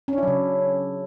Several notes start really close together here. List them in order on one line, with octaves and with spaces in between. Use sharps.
C#4 D4 E4 F#3 C#3